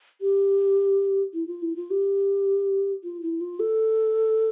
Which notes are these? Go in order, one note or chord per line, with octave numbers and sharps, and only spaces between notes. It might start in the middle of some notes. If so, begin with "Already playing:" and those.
G4
E4
F4
E4
F4
G4
F4
E4
F4
A4